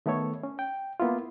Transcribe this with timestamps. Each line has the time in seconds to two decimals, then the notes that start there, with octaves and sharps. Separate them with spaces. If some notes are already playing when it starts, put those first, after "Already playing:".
0.06 D#3 A3 B3 A4 C#5
0.43 C#4
0.59 G5
1.00 A#3 B3 E4 F4